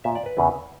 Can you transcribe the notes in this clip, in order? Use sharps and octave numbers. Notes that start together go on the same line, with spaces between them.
A#2 E5
D5
B4
E2 C#3 E3